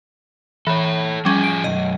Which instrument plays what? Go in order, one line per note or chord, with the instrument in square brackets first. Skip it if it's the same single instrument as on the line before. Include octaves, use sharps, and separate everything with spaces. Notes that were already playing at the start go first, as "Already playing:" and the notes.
[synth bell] E3 [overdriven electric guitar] A4 C#5
[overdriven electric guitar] F3 G#4 [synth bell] G3 C#4
[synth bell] D7
[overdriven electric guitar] B1 F#2 [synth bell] D#5